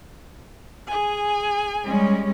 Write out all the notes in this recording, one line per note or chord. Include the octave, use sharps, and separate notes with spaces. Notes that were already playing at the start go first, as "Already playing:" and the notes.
G#4 G#5
G3 G#3 C#4